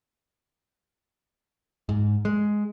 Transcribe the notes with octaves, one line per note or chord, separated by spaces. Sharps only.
G#2
G#3